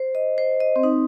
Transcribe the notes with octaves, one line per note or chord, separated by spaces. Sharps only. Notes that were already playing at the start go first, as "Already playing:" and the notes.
Already playing: C5
D#5
C5
D#5
C4
D#4